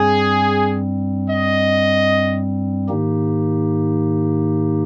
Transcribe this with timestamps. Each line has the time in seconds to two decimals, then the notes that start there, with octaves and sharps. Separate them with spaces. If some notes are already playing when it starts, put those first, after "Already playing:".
Already playing: G2 G3 C4 G#4
1.29 D#5
2.89 G#2 D#3 A#3 D#4 G4